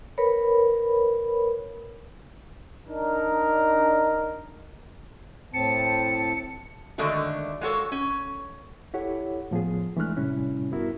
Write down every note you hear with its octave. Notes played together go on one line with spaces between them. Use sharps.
A#4 B4 C#5 B5
D4 D#4 A#4
A2 C4 A5 C#7
D3 D#3 G#3 A3 D4 F#4
G#3 A#3 F#4 A4 C#5
C#4
E4 G4 A4 C#5 F#5
A2 F3 B3 G#4
E3 G#3 A3 D4 F6 F#6
A2 C3 G3 C#4 E4
G2 B3 E4 F#4 A#4